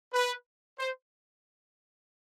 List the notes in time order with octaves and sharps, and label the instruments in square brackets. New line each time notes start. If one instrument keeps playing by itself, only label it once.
[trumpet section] B4
C5